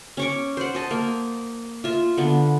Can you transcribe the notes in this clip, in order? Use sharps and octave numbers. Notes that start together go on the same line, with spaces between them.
C#4 C#6 D6
C5 F#5
D#5 A5
A#3
F4 E5
D3 B3